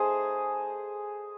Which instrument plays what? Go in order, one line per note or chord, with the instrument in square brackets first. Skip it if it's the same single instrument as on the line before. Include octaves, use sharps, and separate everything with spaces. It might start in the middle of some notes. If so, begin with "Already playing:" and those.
Already playing: [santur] A3 D#4 G#4 C5 D#5